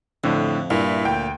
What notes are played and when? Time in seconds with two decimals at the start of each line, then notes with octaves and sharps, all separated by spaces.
0.24 F2 A2 D3
0.70 G2 A#2 E4
1.05 D2 G5